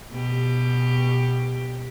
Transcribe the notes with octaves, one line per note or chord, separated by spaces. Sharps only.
B2 G4